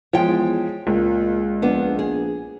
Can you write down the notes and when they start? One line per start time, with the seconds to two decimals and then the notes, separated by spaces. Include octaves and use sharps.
0.13 E2 F3 G#3 C#5 G5
0.87 C#2 A#2
1.62 A#1 B3 D4
1.99 G#4